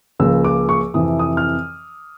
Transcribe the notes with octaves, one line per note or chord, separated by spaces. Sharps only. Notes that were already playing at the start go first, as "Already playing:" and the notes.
C#2 C#3 F3 A#3 E6
D6
C#6
F2 C3 E3 D#6
D#6
F6